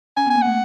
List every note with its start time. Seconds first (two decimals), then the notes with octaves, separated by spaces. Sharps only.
0.17 C#4 G#5
0.26 B3
0.30 G#5
0.35 A#3
0.42 A3 F#5